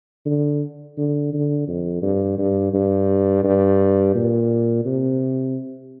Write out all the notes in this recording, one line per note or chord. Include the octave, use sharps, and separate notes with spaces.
D3
D3
D3
F2
G2
G2
G2
G2
A#2
C3